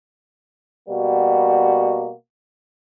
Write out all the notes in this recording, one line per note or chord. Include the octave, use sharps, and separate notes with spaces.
B2 G3 A#3 F#4